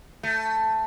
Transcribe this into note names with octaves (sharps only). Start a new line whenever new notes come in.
A3